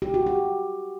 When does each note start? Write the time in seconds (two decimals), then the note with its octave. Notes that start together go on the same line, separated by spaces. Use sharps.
0.02 G4
0.14 F#4
0.26 G4